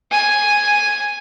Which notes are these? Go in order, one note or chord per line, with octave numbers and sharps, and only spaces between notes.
G#5